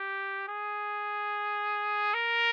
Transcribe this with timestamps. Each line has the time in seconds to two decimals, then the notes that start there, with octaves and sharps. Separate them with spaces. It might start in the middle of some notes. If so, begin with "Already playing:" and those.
Already playing: G4
0.48 G#4
2.14 A#4